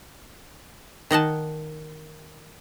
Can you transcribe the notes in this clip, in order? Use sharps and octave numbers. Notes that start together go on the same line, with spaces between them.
D#3 D#5 F#5 A5